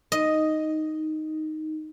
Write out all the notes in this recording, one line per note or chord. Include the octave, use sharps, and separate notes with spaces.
D#4 D#5